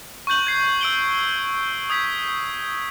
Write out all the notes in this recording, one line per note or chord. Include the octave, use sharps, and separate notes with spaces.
C#6 F#6 G6 F#7
G#6 C7
E6 D7 G7
D#6 G#6 B6